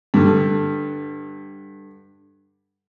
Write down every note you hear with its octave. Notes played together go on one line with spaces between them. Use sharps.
G2 D3